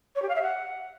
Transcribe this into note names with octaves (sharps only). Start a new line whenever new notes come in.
C#5
G4
F5
E5
F#5